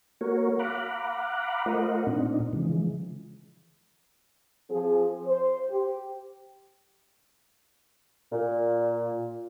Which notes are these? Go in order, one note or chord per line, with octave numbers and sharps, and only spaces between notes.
A#3 F#4 A#4 C#5
F5 F#5 A#5 B5 D6 F#6
A3 F4 A#4 C5 D#5 F#5
A#2 C4 D4 D#4
C#3 E3 F3 G#3
F3 C4 F4 G#4
C5
G4
A#2